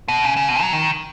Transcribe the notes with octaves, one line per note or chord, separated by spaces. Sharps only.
B2
C#3
C#3
B2
F#3
D#3